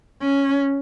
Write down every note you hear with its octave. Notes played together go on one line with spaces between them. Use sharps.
C#4